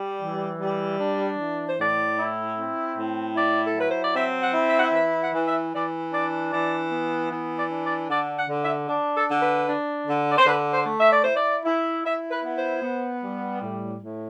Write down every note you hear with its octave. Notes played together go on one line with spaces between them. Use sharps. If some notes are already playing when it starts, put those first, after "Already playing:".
Already playing: G3
E3
G3
D4
E3
C5
A2 D5
E4
C4
A2
E4 D5
A4
F#3 B4
C5
D5
C4 E5
F#5
E4
E5
F#5
E5
E3 E5
F#5
E3
E5
E3 D5
D4 D5
E3 D5
B3
E3
D5
D4
D5
D3 D5
F#5
D3
E5
D4
A4
D3
B4
D4
D3
D5
C5
D3 B4
C5
A3
E5
D5
E4 C5
D5
E4
E4 E5
B4
B3
C5
B3
G3
A2
A2